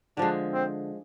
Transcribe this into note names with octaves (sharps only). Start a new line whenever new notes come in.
D3 F3 G#3 D4
C4